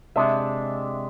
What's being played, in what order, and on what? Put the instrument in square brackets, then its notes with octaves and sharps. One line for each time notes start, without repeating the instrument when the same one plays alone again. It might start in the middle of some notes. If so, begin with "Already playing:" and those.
[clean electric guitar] C3 G#3 D4 [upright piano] E5